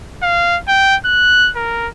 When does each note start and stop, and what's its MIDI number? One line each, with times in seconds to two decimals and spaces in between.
0.23 0.58 77
0.68 0.96 79
1.05 1.50 90
1.56 1.88 70